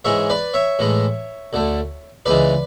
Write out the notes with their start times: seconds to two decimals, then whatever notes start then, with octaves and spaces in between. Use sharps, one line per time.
0.05 G#2 E3 G#3 C#5 E5
0.30 B4 D5
0.54 C#5 E5
0.79 A2 E3 G#3
1.53 D2 D3 A3
2.26 C#2 C#3 E3 G#3 B4 D5